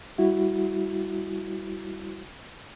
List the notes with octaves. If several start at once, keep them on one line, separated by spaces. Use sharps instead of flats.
G3 E4 F#4